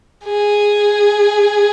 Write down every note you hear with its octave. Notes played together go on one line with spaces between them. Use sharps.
G#4